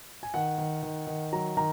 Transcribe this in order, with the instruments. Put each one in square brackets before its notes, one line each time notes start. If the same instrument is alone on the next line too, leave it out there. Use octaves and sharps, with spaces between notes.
[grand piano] G#5
D#3 F#5
D#3
D#3
D#3
F#3 A#5
D#3 A#5